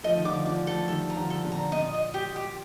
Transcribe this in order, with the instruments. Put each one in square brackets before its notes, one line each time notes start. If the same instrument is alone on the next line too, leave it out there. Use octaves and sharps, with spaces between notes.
[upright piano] F3 A3 [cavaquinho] D#5
[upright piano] D#3
[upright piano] D3 F3 [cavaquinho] D6
[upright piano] D3 F3 [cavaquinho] D6
[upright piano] F3 A3 [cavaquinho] A4
[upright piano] D#3 G3 [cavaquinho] A4
[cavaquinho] A#5
[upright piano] D3 F3
[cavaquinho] A4
[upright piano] A#2 D3
[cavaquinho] A#5
[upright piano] A#2 [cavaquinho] D#5
[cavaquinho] D#5
G4
G4